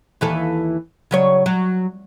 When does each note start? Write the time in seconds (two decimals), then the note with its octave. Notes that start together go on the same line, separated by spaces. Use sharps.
0.21 D#2 E3 A4
1.11 C#3 F#3 C#5
1.46 F#3